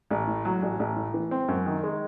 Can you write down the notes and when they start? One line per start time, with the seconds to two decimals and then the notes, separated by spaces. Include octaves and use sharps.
0.10 A1
0.28 A2
0.45 F#3
0.62 A1
0.79 A1
0.96 A2
1.14 E3
1.31 C4
1.48 F#2
1.66 D#3
1.83 G#3